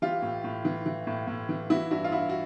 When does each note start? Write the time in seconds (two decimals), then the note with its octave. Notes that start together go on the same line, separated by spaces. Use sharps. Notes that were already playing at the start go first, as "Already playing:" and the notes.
0.02 E3 F4 G4
0.22 A2
0.44 A2
0.65 E3
0.86 E3
1.07 A2
1.27 A2
1.49 E3
1.70 E3 E4 F#4
1.91 G2 E4 F#4
2.04 F4
2.12 G2 E4 F#4
2.29 F#4